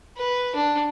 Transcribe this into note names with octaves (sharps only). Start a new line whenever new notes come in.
B4
D4